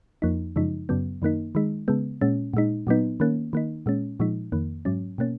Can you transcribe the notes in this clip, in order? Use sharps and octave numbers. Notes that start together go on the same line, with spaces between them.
F2 F3 A#3 D#4
F#2 C#3 F3 G#3 D#4
F#2 C#3 F#3 B3
F#2 D#3 A#3 D#4
D#3 G#3 D#4
C#3 G#3 B3
A#2 G#3 C#4
A#2 G#3 D#4
A#2 F#3 B3 D#4
D#3 A#3 C#4
D#3 A#3 D#4
A#2 G#3 C#4
A#2 F3 G#3 D#4
F2 D#3 A#3
G#2 F#3 C#4
B2 A#3 C#4